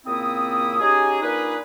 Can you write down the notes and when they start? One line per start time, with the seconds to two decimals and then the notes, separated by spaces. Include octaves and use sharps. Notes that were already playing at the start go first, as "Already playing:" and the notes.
0.06 A#2 C#3 A#3 C4 E4 D#6
0.80 C#4 D#4 G4 G#4
1.21 A#3 D4 D#4 F4 G#4 B4